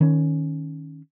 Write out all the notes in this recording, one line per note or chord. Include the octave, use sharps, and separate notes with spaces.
D#3 C#4